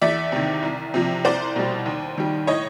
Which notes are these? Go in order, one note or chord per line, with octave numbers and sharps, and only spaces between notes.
E2 D5 E5
C3 D#3
C2
C3 F3
C2 C5 D5
B2 G3
D#2
D#3 G3
A2 C#5 D#5